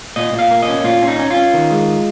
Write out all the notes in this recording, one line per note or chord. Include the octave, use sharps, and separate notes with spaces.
A#2 D#5
A#2
F5
A#3
D#5
C#4
A#2 F4
C#4
D#4
C#4
F4
C#4
D#3
G#3